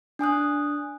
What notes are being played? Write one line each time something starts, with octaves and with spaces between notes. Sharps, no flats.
D4 G#5 D#6 F#6